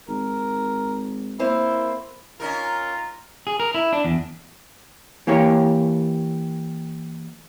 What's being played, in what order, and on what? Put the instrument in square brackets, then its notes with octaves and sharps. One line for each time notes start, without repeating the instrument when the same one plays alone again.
[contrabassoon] G#1 [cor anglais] A#4
[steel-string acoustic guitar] A#3 C4 C5 [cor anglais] E4
[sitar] C#4 D#4 A#4 [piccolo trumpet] F4 [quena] A#5
[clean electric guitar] G#4
A#4
E4
D4
E2
[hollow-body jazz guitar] E3 A#3 G4 C#5